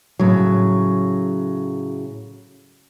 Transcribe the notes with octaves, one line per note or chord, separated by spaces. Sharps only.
A2 C#3 F#3